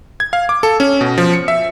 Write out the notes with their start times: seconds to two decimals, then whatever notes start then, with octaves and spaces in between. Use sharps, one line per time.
0.20 G#6
0.33 F5
0.49 D6
0.63 A4
0.80 C#4
1.01 B2
1.18 F3
1.33 C#7
1.48 E5